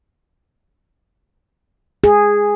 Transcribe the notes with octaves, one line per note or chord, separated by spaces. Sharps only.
G#4